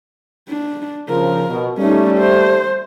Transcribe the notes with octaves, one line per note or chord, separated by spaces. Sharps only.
D4
C#3 F3 A#4
B2
G3 A3 C#4 D#4
C5